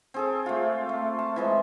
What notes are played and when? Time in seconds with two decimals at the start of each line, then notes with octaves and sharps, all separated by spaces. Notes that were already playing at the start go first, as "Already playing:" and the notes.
0.14 C4 G#4 A4
0.46 A3 F4
0.89 A3
1.19 A5
1.36 E3 F3 G#3